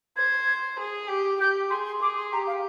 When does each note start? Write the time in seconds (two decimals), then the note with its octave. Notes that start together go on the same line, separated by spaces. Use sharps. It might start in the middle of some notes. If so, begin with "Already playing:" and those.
0.17 C5 G#6
0.79 G#4
1.09 G4
1.40 G4 G6
1.70 G#4 C6
1.85 C6
2.02 G#4 D6
2.17 C6
2.32 G4 A#5
2.47 F5